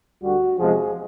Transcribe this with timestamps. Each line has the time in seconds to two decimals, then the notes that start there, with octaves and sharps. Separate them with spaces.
0.21 D2 D3 G3 F#4
0.58 E2 C3 F3 G#3 G#4